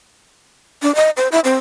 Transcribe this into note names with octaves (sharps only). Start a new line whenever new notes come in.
D4
D#5
C5
E4
C4